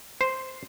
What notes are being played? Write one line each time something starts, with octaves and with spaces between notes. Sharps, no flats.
C5